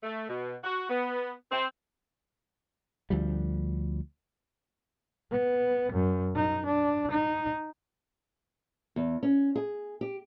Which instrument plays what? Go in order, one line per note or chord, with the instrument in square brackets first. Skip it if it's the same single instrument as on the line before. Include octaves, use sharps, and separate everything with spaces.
[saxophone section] A3
B2
F#4
B3
C4
[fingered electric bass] D2 F3 G3
[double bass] B3
F#2
D#4
D4
D#4
[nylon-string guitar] E2
C#4
G#4
G4